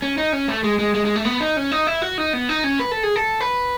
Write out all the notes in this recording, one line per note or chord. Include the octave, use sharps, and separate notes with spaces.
C#4
D#4
C#4
A3
G#3
G#3
G#3
G#3
A3
B3
D#4
C#4
D#4
E4
F#4
D#4
B3
D#4
C#4
B4
A4
G#4
A4
B4